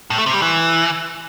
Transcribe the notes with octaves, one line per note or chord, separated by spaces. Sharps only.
A2
A3
C3
G3
E3